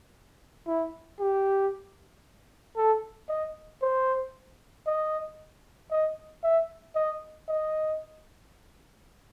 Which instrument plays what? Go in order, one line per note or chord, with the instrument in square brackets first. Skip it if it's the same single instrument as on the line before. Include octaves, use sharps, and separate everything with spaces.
[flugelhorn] E4
G4
A4
D#5
C5
D#5
D#5
E5
D#5
D#5